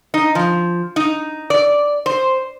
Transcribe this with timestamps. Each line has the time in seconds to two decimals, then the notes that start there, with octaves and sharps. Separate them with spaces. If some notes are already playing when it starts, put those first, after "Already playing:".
0.14 D#4
0.35 F3
0.96 D#4
1.50 D5
2.06 C5